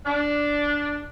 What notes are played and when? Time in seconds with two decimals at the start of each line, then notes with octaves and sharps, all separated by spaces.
0.06 D4